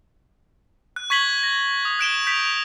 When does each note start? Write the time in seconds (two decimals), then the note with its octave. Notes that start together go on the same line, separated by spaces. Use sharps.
0.96 F#6
1.10 C#6 G#6 B6 F#7 G7
1.43 A#6
1.85 D#6
1.99 F#6 D7 E7 G7
2.27 G6 B6 F7